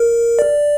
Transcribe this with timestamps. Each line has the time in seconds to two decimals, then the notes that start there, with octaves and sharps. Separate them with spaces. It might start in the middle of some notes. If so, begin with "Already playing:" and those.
Already playing: A#4
0.39 D5